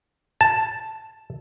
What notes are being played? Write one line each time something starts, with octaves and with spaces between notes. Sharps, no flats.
A5